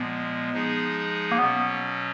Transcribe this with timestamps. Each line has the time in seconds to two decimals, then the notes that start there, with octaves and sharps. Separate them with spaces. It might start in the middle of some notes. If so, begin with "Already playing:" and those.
Already playing: A#2 F3 G#3 B3
0.53 F3 G#3 D#4 G#4
1.32 A#3
1.38 B2 F#3 B3 C#4